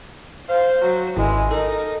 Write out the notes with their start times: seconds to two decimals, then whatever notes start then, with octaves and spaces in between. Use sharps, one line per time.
0.49 C5 F5
0.82 F#3
1.17 G#1 G#3 E4
1.51 D#4 A4 A#4